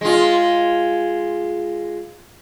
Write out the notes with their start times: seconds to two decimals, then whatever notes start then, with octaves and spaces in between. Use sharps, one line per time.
0.01 G#3 F4